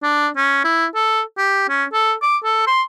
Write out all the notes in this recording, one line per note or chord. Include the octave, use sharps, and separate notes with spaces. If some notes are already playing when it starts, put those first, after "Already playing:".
D4
C#4
E4
A4
G4
C#4
A4
D6
A4
C6